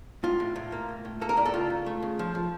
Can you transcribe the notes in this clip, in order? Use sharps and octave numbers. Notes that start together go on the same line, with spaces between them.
A2 F4
A2
A2
A#3
A2
A2
A#3 A4
A#4
A2 D5
A4
C#3 F4
C#3
A3
C#3
F3
F3